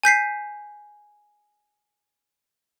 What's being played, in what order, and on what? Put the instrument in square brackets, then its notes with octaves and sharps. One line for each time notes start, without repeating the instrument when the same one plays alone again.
[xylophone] G#5 G6 B6 C7